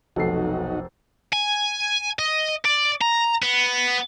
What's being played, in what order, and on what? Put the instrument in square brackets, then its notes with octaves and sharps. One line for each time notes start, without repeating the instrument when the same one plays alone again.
[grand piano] F1 A4 C7 [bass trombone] B1 [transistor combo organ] D#4 F#4
[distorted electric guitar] G#5
D#5
D5
A#5
B3